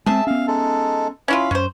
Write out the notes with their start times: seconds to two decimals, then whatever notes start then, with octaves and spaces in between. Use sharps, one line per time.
0.06 G#3 B3 C4 G#4 E5 A5
0.27 B3 C#4 F5
0.47 G#3 D#4 A4
1.28 C#4 E4 F4 F5 B5
1.51 F#2 C#4 C5